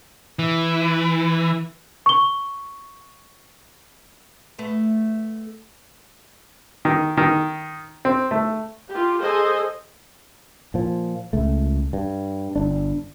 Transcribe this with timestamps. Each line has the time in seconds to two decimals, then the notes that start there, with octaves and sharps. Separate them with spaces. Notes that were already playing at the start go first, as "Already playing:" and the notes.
0.39 E3
2.06 C#6 G7
4.59 A3 B3
6.85 D#3
7.17 D#3
8.05 C4
8.31 A3
8.88 F4 G4
9.21 G#4 A4 C5 D#5 G#5
10.74 A#2 F3
11.33 C#2 A3
11.93 G2
12.56 G1 D4